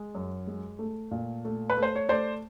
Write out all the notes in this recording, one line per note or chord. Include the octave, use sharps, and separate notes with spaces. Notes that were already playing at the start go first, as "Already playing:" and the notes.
Already playing: G#3
F#2
G#3
A3
A#2
A3
B4
A3
C5
C#5
A3 C5 D5